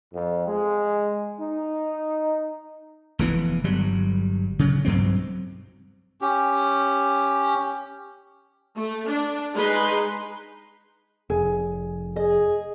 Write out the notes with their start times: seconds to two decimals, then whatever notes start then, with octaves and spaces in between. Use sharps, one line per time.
0.14 F2
0.47 G#3
1.40 D#4
3.19 F1 E3 B3
3.64 G1 F#3 G3
4.59 C#3 F#3
4.85 B1 G2 F#3 C4
6.21 C#4 G4
8.76 A3
9.06 D4
9.54 G#3 D#4 B4 C6
11.30 F1 G#4
12.16 G#4 D#5